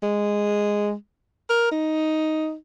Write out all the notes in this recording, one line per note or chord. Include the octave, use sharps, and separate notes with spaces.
G#3
A#4
D#4